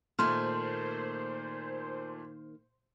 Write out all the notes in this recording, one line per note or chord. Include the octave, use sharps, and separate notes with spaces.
A#2 D#3 A3 A#3 C5 C6 F6